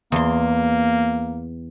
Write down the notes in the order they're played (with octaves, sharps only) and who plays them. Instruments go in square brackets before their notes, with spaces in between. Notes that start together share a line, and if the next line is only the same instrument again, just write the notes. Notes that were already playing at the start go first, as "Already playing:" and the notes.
[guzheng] E2 C6 [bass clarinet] A#3